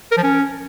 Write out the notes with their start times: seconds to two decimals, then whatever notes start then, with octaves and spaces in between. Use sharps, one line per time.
0.11 A#4
0.17 F3
0.23 C#4